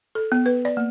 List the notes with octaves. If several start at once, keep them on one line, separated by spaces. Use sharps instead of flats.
A4
B3
B4
D5
A#3